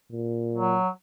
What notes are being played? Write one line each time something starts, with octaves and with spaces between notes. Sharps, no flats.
A#2
F#3